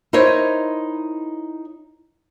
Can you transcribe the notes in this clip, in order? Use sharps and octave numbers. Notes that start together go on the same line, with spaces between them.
D#4 E4 A#4 C5 C#5 D#5